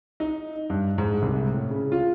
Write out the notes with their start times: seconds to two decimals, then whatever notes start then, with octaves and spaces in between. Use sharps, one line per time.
0.20 D#4
0.70 G2
0.98 G#2
1.22 C2
1.52 A2
1.70 C#3
1.92 F4